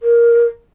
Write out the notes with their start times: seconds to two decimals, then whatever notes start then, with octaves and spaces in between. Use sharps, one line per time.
0.01 A#4